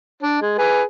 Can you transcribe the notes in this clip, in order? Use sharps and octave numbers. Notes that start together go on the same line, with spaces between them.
D4
G#3
G#4 B4